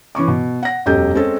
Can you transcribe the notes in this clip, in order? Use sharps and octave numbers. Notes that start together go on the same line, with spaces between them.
E3 C#4 C#6 D6
B2
F#5 A#6
E1 F#2 G4 A4 D#5 G6
G#3 C4 C#4 G#4 A4